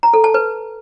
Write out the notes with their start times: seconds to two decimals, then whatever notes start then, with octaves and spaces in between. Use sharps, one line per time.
0.03 A#5
0.13 A4
0.24 A5
0.34 B4